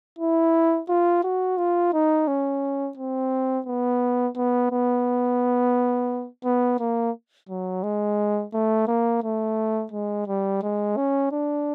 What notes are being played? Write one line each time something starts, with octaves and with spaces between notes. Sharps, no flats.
E4
F4
F#4
F4
D#4
C#4
C4
B3
B3
B3
B3
A#3
F#3
G#3
A3
A#3
A3
G#3
G3
G#3
C#4
D4